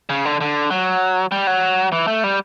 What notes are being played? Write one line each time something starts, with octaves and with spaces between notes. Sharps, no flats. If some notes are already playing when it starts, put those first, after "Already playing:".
C#3
D3
D3
F#3
G3
F#3
E3
A3
G3